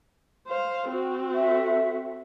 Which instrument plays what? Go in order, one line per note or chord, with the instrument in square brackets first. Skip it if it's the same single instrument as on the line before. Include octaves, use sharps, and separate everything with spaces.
[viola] C5 F5
C4 F#4
[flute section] A4 E5